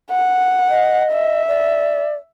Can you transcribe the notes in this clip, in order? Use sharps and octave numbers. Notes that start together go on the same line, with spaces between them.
F#5
D#5
E5
D5